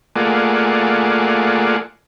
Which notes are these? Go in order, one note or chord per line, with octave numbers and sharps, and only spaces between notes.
A3 A#3 F4 G#4 D5 F#5